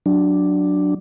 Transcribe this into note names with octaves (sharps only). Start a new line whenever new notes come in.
F#3 D4